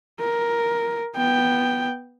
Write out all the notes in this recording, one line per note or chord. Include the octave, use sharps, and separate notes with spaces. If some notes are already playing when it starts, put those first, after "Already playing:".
A#4
B3 G5